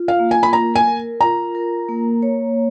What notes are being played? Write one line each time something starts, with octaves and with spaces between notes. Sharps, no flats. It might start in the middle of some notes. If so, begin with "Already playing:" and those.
Already playing: F4
F5
A#3
G#5
B5
A#4 A#5
G#5
A#4
F4 A#5
A#4
A#3
C#5